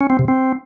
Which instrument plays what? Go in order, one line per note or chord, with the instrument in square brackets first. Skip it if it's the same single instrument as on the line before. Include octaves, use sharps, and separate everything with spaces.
[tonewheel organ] C#4
C4
C3
C4